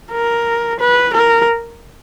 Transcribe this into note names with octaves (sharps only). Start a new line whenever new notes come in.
A#4
B4
A#4